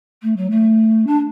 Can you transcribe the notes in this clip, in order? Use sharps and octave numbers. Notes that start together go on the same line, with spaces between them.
A3
F#3
A3
D4